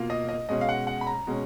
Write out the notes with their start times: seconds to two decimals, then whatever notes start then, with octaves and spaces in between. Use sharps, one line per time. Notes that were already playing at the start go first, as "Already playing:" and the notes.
Already playing: B2 A#3 F4
0.10 D#5
0.29 D#5
0.49 B2 G#3 C#4 D#5
0.61 F5
0.69 F#5
0.87 F#5
1.01 B5
1.07 A#5
1.27 B2 G#3 C#4